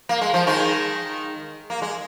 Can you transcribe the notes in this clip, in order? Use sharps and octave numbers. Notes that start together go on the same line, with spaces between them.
A#3
G#3
F3
D#3 G#3
A#3
G#3